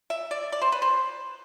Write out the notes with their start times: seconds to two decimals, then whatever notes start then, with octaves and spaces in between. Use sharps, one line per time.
0.10 E5
0.31 D5
0.52 D5
0.62 C5
0.72 B4
0.82 C5